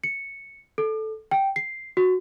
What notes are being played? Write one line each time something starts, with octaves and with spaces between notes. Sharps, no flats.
C#7
A4
G5
C7
F#4